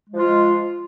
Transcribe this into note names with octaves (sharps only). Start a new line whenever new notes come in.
F3 G#3 F4